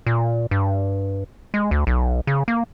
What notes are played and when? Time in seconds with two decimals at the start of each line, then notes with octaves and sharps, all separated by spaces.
0.07 A#2
0.51 G2
1.54 G#3
1.71 D2
1.87 B1
2.27 C#3
2.48 A#3